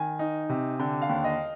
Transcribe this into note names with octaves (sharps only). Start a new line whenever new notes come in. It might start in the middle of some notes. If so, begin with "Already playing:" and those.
Already playing: D#3 G#5
D#4
C3
D3 G5
F5
D#2
D#5